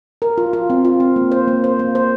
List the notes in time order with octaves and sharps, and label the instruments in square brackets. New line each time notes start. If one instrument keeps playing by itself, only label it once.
[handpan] A#4
F4
F4
C4
F4
C4
A#3
C5
A#3
C5
A#3
C5